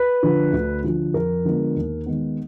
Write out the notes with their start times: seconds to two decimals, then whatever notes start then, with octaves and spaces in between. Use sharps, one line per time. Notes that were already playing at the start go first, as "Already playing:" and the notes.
Already playing: B4
0.23 D3 F3
0.53 D2
0.83 D3 F3
1.14 F2 A#4
1.45 D3 F3 G#3 B3
1.76 D#2
2.06 D#3 G#3 B3